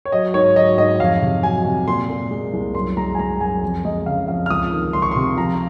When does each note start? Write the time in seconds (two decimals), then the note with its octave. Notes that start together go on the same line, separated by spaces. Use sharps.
0.05 C#5
0.12 F#3 D#5
0.34 G#2 C#5
0.56 F#3 D#5
0.78 G#2 D#5
1.00 F2 F5
1.22 C3
1.43 F#3 G#5
1.65 C3
1.87 A#2 C6
2.09 A#2
2.31 G#3
2.53 C2
2.75 F#2 C6
2.97 G#3 A#5
3.15 G#5
3.19 G#3 A#5
3.41 F#2 G#5
3.62 F2
3.85 G#3 D#5
4.06 C#3 F5
4.28 F2 F5
4.46 F6
4.50 C#2 D#6
4.72 D#3
4.93 C#2 C6
5.02 C#6
5.11 C3 C6
5.37 F3 A#5